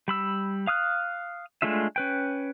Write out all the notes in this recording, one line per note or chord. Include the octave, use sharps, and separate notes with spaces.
G3 B5 E6
F5 D#6 F6 F#6
G#3 A3 D4 F4 E5
C#4 B4 G5